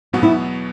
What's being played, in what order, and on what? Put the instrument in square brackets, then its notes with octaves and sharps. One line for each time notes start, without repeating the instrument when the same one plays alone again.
[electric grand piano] E2 B2 F#3 B3 [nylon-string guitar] F#4
[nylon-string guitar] E4